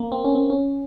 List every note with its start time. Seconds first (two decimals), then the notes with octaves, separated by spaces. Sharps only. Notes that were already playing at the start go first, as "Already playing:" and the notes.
Already playing: A#3 C4
0.12 C4
0.24 C#4
0.35 C4
0.50 C#4